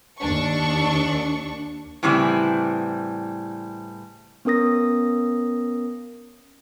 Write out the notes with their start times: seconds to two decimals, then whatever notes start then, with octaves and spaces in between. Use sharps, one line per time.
0.19 D#2 D4 C#6
2.03 A2 C#3 E3 G3 C4
4.45 B3 C#4 A#4 D#6 A#6